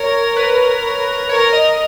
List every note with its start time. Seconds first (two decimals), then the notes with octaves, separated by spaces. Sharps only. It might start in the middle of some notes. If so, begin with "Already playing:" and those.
Already playing: A#4 C#5
0.37 B4
1.29 A#4 C#5
1.53 D#5